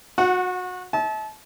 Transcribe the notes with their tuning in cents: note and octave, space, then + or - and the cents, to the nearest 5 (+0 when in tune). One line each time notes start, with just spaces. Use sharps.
F#4 -25 F#5 +0
E5 -40 A5 -30